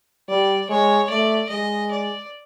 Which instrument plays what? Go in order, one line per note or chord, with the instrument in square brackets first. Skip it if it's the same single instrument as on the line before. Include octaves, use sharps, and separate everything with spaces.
[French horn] G3 [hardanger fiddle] D5
[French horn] G#3 [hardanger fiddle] C#5
[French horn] A3 [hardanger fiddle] D5
[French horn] G#3 [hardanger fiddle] D#5
[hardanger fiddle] D5